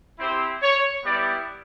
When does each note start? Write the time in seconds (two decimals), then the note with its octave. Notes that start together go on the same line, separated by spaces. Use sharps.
0.19 C4 E4 G4 C5
0.62 C#5
1.04 G3 B3 E4 G4 D5